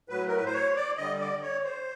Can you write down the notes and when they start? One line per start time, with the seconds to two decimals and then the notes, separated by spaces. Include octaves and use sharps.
0.09 A2 F#3 B4
0.27 A#4
0.36 B4
0.46 C5
0.53 C#5
0.76 D5
0.97 D3 G3 D#5
1.20 D5
1.42 C#5
1.64 C5